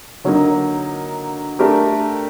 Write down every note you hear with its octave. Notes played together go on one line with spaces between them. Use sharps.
D3 F#3 A#3 D#4
A3 D4 G4 A#4